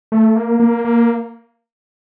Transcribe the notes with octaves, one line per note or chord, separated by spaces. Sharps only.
A3
A#3
A#3
A#3